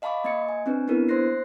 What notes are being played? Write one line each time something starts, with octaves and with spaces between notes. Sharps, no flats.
D#5 F5 A5 B5 C#6 D6
A#3 D#5 A6 C#7
G#5
C4 D4 B4
B3 D4 E4 A#4 B4
A#3 C5 C6 F#6 A#6 C7